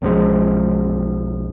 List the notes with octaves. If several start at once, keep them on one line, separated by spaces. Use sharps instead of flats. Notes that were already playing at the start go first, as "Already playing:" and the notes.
B1 F#2 F3 G#3